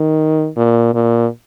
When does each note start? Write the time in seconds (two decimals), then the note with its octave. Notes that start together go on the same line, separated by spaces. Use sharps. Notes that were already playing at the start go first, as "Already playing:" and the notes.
Already playing: D#3
0.56 A#2
0.94 A#2